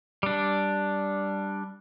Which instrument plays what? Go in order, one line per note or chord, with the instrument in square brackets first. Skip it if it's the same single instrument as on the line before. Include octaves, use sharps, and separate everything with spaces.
[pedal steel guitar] G3 D4